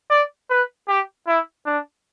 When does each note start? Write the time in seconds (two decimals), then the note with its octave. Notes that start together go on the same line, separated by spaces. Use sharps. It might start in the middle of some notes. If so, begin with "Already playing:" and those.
0.10 D5
0.50 B4
0.88 G4
1.27 E4
1.66 D4